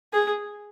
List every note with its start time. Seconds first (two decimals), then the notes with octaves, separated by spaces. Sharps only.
0.13 G#4